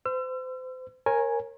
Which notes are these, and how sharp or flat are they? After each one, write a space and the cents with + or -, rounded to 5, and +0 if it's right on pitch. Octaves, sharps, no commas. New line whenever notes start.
C5 -35 E6 +40
A#4 +0 C#5 -35 G#5 +0